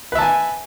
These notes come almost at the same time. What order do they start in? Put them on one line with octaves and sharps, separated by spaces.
B4 E5 A5 G#5